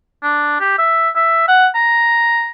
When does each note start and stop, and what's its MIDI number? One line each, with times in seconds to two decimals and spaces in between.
0.23 0.58 62
0.60 0.77 67
0.79 1.10 76
1.16 1.45 76
1.48 1.67 78
1.75 2.49 82